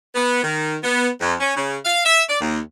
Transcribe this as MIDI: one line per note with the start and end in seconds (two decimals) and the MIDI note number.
0.15 0.41 59
0.44 0.77 51
0.83 1.09 59
1.21 1.34 41
1.40 1.54 61
1.57 1.78 49
1.85 2.00 77
2.05 2.22 76
2.29 2.41 74
2.41 2.59 39